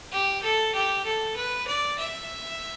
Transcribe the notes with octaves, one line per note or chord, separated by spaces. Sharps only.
G4
A4
G4
A4
B4
D5
E5